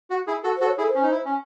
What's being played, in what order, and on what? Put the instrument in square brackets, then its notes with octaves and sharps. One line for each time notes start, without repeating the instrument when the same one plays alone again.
[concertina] F#4
E4 G#4
F#4 A4
[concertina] F#4 A4 [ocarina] C5
[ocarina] C#5
[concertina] E4 G#4 [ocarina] A4
[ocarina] C5
[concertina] C#4
D#4
E4
C#4